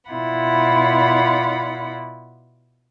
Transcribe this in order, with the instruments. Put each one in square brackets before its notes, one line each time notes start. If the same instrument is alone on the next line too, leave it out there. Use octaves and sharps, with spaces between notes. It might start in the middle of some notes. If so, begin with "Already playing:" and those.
[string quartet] B2 E4 F4 D5 F#5 B5